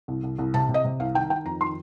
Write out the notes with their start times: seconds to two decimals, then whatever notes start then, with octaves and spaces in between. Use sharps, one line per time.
0.08 C2
0.24 C2
0.38 C2
0.54 C3 A5
0.69 C3
0.74 D#5
0.84 C3
1.00 C2 F5
1.15 D#3 G5
1.30 D#3 G5
1.45 F2 A#5
1.61 D#3 C6